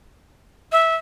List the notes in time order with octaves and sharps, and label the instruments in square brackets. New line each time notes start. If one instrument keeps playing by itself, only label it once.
[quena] E5